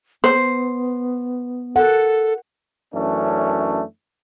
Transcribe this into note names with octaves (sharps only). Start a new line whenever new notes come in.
B3 C5
A4 A#4 F#5
F#2 E3 A3 C#4 D4